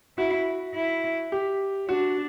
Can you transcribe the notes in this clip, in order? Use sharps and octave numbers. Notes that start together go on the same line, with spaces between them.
E4 F#4
E4
G4
D4 F#4